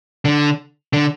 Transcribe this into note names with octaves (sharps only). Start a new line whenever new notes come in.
D3
D3